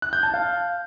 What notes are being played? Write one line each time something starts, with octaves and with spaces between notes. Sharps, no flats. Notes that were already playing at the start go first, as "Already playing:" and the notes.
F#6
G6
A5
F5